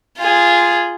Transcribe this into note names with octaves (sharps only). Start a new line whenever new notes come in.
F4 G#4